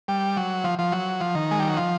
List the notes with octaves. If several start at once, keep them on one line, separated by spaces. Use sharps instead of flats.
G3
F#3
F3
F3
F#3
F3
D#3
G#3
G3
F#3
F3